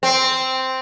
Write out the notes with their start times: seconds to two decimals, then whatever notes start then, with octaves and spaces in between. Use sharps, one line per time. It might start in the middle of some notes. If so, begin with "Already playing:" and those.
0.03 C4